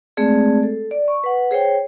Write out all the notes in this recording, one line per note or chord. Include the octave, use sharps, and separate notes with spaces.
G#3 A3 C4 G#4 D5
A4
D5
C#6
B4 F#5
G#4 C5 C#5 G5